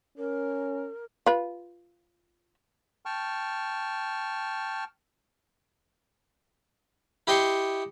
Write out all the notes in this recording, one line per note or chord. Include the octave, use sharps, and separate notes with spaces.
C#4 A#4
F4 B4
G5 A5 C#6 F6
E4 G4 D#5 G5 C6 C#6